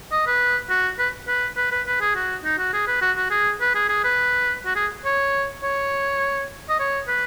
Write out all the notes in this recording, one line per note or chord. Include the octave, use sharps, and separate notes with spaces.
D#5
B4
F#4
B4
B4
B4
B4
B4
G#4
F#4
D#4
F#4
G#4
B4
F#4
F#4
G#4
B4
G#4
G#4
B4
F#4
G#4
C#5
C#5
D#5
C#5
B4